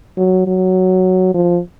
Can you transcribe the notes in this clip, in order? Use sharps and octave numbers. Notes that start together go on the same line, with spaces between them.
F#3
F#3
F3